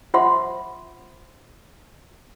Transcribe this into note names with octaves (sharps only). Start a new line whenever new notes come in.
F4 C5 E5 F#5 C6 D6